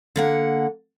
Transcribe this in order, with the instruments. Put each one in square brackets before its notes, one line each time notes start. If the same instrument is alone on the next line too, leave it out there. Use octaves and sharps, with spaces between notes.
[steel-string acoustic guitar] D3 A#3 F#5